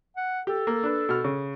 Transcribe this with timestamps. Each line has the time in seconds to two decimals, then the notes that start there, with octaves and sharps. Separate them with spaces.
0.16 F#5
0.47 G4 A4
0.67 A#3
0.83 D4 B4
1.09 B2 F6
1.24 C#3